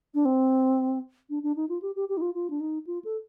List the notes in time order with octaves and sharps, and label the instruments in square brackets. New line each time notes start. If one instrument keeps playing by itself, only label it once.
[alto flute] D4
C4
D4
D4
D#4
F4
G4
G4
G4
D#4
F4
F4
D4
D#4
F4
A4